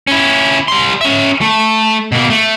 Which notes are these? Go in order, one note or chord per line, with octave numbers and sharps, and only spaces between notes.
C#4 E4
G3 C6
C#4 E5
A3
B2 A#3
A3